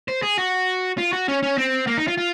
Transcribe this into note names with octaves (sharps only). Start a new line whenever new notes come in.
C5
G#4
F#4
F4
F#4
C#4
C#4
C4
A#3
D#4
F4
F4